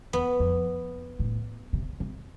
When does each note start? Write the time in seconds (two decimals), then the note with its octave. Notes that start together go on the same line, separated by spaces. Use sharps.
0.13 E2 B3
0.40 F2
1.19 A2
1.73 C3
2.00 C3